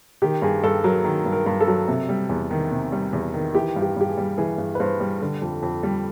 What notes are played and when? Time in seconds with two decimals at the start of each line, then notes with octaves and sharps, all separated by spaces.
0.22 D#3 G4
0.42 G2 G#4
0.63 G2 A4
0.84 F#3 A#4
1.04 D#3 A#4
1.26 G2
1.32 A#4
1.46 G2
1.60 A4
1.68 F#3
1.88 C3
2.09 G3
2.29 E2
2.51 D#3
2.71 C3
2.92 G3
3.13 E2
3.34 D#3
3.54 E3 G4
3.76 G2
3.82 G4
3.96 G2 G4
4.09 G#4
4.17 G3
4.38 E3 G#4
4.58 G2
4.75 B4
4.80 G2 C5
5.00 G3
5.22 D3
5.42 F2
5.62 F2
5.83 G3